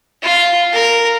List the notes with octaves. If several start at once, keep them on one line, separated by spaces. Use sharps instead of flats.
F4
A#4